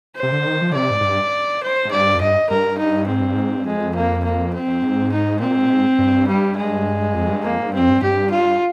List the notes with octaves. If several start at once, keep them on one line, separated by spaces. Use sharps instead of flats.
C5
C3
D3
D#3
F3
D3
C3 D5
G#2
G#2
G2
C5
G#2
G2 D5
F2
G2 D#5
G2 A#4
D#4
G#2 C4
G2
G#2
G2
F2 G#3
A#3
A#3
C4
F2
G#2
D#4
A#2 C4
A#2
G#2
A#2
G#2
G2
G3
G#3
F2
G2
F2 A#3
G#2
G2 C4
F2
G2
G2 G4
F4